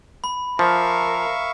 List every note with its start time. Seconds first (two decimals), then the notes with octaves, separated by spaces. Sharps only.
0.24 B5
0.59 F3 A#4 E5 F5 C#6